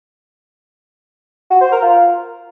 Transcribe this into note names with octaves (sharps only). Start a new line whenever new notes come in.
F#4
C5
A#4
F4